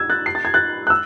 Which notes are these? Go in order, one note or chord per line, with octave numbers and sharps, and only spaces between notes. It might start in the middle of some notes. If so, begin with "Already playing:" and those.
Already playing: E6 G#6
F#6 A6
C7
A6
G#6
F#6 A6
F#6
E6